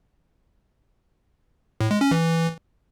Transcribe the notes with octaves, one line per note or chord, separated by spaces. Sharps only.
A2
G#3
C#4
E3